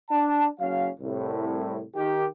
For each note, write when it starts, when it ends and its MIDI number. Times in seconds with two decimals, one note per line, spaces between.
0.10 0.47 62
0.10 0.47 81
0.60 0.88 30
0.60 0.88 54
0.60 0.88 61
0.60 0.88 77
1.00 1.82 36
1.00 1.82 45
1.96 2.26 51
1.96 2.26 67